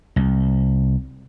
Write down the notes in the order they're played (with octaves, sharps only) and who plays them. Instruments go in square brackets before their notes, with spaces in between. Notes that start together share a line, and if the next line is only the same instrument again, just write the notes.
[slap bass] C2